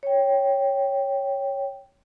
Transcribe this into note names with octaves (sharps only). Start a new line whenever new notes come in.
C#5 G5